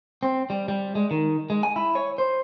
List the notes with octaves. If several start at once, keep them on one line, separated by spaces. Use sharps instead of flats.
C4
G3
G3
G#3
D#3
G#3
G#5
E4
C#5
C5